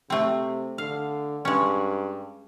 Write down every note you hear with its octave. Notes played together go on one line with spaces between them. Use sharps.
C3 A3 C4
D3 F5
G2 G#3 C#4